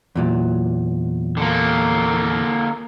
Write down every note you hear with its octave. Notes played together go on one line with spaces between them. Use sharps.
E2 A#2 F#3
D3 A#3